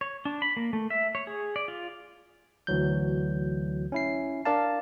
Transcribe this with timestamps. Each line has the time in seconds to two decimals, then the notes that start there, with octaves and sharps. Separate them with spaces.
0.01 C#5
0.25 D4
0.42 B5
0.57 A#3
0.73 A3
0.90 E5
1.15 C#5
1.27 G#4
1.56 D5
1.68 F4
2.67 D2 E3 F#3 G6
3.92 C#4 E4 C7
4.45 D4 A#4 D5 F5 A5